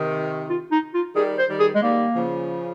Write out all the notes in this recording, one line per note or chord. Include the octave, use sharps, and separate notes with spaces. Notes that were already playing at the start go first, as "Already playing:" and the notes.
Already playing: C3 D#3
F4
D#4
F4
D#3 G3 G#4
C5
D#3 G3
G#4
G#3
D#3 G3 A#3
C#3 F3